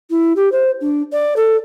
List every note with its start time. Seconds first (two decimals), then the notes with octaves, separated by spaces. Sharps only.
0.10 E4
0.36 G4
0.52 C5
0.81 D4
1.12 D5
1.36 A4